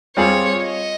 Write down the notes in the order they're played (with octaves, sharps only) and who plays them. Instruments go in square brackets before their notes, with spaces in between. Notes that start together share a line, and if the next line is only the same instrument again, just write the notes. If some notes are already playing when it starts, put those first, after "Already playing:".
[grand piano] G3 C4 F4 G#4 [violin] C#5
[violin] D#5